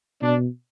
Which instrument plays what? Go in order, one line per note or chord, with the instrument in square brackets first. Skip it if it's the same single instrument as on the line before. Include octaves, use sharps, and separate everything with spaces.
[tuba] B2 [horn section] D4